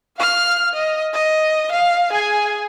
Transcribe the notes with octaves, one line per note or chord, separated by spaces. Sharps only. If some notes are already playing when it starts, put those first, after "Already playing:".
F5 F6
D#5
D#5
F5
G#4 G#5